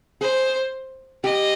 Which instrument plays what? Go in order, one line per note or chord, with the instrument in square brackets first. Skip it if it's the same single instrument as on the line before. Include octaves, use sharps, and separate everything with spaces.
[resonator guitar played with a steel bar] G#4 [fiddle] C5
[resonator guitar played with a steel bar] G4 [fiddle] D#5